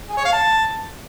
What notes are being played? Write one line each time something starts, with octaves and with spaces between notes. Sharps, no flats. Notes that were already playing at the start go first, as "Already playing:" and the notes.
G#4
C#5
F5
A5